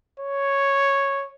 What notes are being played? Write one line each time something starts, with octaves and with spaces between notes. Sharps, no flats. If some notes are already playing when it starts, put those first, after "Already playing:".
C#5